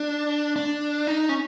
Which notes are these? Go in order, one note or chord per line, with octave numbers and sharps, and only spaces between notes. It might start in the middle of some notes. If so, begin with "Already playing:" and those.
Already playing: D4
D4
D#4
C#4